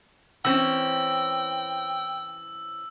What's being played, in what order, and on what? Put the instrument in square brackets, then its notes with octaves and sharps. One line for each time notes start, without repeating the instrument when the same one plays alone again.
[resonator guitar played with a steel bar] E3 C4 C#4 [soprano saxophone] G5 [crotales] E6